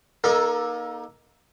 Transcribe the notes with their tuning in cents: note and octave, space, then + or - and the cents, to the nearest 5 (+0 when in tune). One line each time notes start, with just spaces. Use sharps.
A#3 +30 D#4 +0 A4 +0